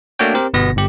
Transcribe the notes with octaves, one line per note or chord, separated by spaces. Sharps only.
A3 A#3 D4 F#4 C#5 G5
C4 G4 A#4 C5
G1 B2 B3 A#6
G1 G4